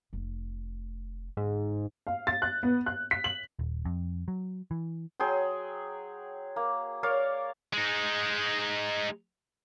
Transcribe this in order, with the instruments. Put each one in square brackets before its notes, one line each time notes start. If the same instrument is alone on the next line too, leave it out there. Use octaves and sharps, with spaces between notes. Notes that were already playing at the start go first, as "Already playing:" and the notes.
[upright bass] F1 A3
[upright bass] G1 [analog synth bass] G#2
[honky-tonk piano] F5
A6
F#6
B3
F#6
B6
F#7
[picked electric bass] D#1
F2
F#3
E3
[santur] F#3 G#4 G5 C6
A#3
A#4 C#5 D5 F5
[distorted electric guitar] G#3 D#4